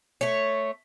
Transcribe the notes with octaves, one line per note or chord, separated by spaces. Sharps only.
A3 C#5